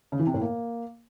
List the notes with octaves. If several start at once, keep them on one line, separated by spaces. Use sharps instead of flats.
C#3
E3
C3
A2
A#3